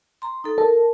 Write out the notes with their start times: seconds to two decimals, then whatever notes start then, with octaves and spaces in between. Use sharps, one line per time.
0.22 A#5 C6
0.44 D#4 A4
0.58 A4 A#4